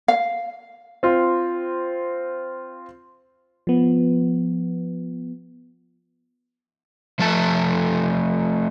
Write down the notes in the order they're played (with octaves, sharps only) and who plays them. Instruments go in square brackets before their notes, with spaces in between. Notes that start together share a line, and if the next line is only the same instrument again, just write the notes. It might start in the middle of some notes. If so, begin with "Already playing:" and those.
[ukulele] F5
[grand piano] C4 F4
[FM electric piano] F3 B3
[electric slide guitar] F3 A3 A4 A5